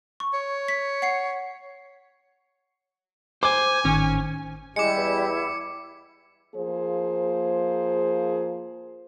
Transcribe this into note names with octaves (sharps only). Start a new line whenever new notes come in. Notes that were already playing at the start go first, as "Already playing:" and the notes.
C#6
C#5
B6
F#5 C7
C5 G#5 D6
G#1 A2 D#3 C#4
G3 G#3 E4 G4 D6 C#7
E2
F3 A#3 G#4 C5